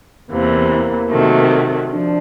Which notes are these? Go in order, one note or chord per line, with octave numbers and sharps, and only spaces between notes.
E2 C3 E3 A#3
C3 D#3 F#3 A3
F3 D4